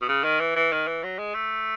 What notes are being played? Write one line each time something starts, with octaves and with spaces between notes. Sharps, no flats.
B2
C#3
D#3
E3
E3
D#3
E3
F#3
G#3
A3